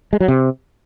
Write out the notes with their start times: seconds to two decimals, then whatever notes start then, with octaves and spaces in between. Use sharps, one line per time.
0.13 G#3
0.20 F#3
0.28 C3